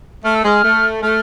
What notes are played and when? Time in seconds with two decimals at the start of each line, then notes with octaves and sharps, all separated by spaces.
0.24 A3 F6
0.34 E6
0.44 G#3 F6
0.63 A3
1.02 A3 F6